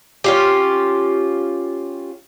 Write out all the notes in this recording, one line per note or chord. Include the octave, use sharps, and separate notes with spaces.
C#4 F4 G4